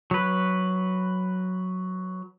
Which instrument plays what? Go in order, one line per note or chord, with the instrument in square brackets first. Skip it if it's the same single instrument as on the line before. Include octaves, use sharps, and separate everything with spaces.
[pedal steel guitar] F#3 B4